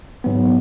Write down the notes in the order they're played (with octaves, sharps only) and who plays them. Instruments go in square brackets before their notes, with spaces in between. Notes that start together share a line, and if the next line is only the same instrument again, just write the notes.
[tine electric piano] G#2 F#3 B3